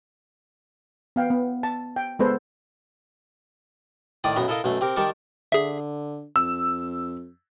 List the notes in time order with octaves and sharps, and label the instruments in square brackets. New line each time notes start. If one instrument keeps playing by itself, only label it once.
[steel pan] B3 F5 G5
B3
A5
G5
G#3 B3 A4 B4 C5
[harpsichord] A2 D#3 D5 D#6
B1 F#2 B3 A#5
E4 A4 A#4 D#5 F5
B1 F#2 A3
C4 G4 A#4
D#3 G3 A#4 A5 C#6 D6
[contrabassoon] D3 [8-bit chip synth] G#4 E5
[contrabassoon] F2 [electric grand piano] E6